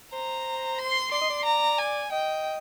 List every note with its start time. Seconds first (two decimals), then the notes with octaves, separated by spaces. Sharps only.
0.13 C5 A#5
0.79 C6
1.11 D5 C6
1.22 D#5
1.30 D5
1.45 A#5
1.78 G#5
2.12 D#5 G5